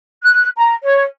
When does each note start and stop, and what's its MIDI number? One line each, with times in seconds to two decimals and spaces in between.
0.24 0.48 90
0.57 0.73 82
0.83 1.03 73